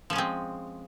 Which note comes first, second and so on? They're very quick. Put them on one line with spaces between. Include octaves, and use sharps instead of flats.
F3 C#4 G#3 C4